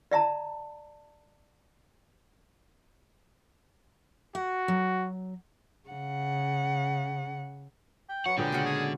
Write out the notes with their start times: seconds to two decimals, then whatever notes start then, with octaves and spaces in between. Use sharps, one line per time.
0.11 D5 E5 A5 A#5
4.35 F#4 F#5
4.68 F#3
5.89 C#3 F#5
8.09 G5
8.26 F#3 B4 F#5 C#6
8.38 A#2 D3 G#3 B3 G5
8.52 C#3 F#4 F5
8.65 G#4